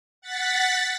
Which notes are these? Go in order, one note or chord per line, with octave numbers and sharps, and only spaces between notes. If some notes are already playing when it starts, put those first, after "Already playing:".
F#5 A6 B6